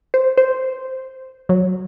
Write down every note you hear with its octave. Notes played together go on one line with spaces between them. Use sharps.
C5
C5
F#3